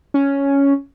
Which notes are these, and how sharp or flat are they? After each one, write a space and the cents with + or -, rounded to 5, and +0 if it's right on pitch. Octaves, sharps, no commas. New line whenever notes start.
C#4 +5